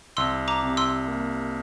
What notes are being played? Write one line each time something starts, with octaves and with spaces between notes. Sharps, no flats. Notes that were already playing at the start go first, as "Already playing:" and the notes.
C2 C6 E6
A#5 D6
C3
C6 E6
A#3